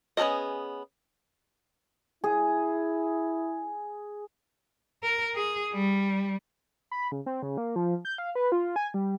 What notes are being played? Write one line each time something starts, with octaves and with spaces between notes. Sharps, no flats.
B3 C#4 G#4 A4 D#5
E4 G#4
A#4
G#4
G3
B5
C#3
C4
C#3
A#3
F3
G6
F5
B4
F4
G#5
G3